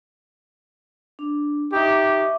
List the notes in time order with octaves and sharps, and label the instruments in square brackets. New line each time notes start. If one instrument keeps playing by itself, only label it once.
[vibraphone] D4
[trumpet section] D#4 G4 [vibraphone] E5 C#6 D6